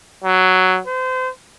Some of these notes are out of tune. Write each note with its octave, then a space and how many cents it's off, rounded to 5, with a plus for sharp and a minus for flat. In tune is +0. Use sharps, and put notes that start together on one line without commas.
F#3 +5
C5 -30